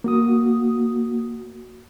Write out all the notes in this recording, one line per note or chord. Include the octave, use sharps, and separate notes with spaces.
A#3 F#4 D#6